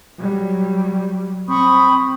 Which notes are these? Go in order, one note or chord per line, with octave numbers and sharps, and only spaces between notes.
F#3 G3
C4 B5 C#6 D#6